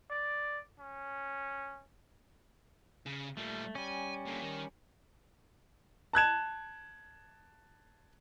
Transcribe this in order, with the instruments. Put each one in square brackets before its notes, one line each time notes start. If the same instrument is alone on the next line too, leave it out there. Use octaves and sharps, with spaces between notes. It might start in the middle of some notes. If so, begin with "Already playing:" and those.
[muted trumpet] D5
C#4
[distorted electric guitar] C#3
[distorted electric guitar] A#2 G3 [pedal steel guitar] A3
[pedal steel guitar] G3 C#4 [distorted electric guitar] G#5
[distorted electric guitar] A#2 D3
D#3
[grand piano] A5 F#6 G#6 E7